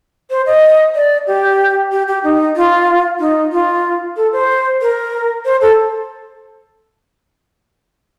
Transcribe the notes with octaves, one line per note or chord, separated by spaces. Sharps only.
C5
D#5
D5
G4
G4
G4
D#4
F4
D#4
F4
A4
C5
A#4
C5
A4